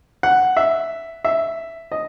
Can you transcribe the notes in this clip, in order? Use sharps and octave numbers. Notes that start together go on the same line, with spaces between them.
F#5
E5
E5
D#5